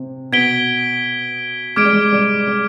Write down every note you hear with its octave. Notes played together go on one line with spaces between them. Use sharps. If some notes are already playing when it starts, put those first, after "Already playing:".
Already playing: C3 C4
B2 B3 G#6 B6 D7 G7
G#3 D6 F6 G#6 D7
G3
G#3
G3
G3